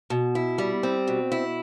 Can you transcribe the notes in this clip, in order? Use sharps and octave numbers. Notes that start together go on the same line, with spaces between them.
B2
E4
G3
C4
B2
E4